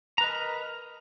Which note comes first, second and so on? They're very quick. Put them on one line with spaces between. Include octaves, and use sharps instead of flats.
A#5 B4 D#5 A#4